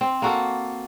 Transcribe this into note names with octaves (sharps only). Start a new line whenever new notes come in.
C4
A#3 F#4 A4